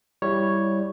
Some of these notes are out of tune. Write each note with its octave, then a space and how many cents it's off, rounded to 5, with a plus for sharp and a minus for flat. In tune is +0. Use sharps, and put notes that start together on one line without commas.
G3 +0 E4 +0 C#5 +0